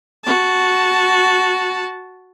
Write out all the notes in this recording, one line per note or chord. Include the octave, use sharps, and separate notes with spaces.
F#4 A5